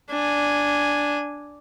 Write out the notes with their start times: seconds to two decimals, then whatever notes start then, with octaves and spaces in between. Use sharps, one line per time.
0.10 D4 G#5